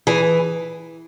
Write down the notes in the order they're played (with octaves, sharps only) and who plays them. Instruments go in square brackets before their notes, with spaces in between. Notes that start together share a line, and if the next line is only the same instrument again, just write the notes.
[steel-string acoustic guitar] E3 G#4